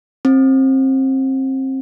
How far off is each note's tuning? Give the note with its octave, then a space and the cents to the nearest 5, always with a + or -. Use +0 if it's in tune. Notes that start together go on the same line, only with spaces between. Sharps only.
C4 +25